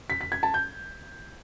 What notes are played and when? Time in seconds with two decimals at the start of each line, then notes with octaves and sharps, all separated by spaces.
0.10 B6
0.21 B6
0.32 G#6
0.43 A5
0.54 G6